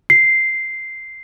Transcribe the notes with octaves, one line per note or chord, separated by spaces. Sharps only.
C7